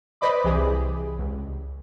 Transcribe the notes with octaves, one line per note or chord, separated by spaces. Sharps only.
B4 C5 D5 D#5 B5 D6
C2 E3 G4 G#4
C#2